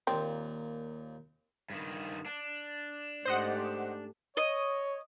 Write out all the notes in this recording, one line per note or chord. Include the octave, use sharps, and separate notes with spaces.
D#2 A#2 C4
G2 D#3
D4
G#2 A3 G4 C5 D#5 F#5
C#5 D#5